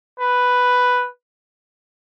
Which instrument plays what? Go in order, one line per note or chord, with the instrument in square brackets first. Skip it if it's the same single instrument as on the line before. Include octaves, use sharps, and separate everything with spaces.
[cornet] B4